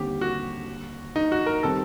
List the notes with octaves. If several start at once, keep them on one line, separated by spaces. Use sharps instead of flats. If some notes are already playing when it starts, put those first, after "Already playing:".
Already playing: D#2 D3 G3 C4 G4
F#4
D#4
F#4
A#4
D#3 G3 C4 A4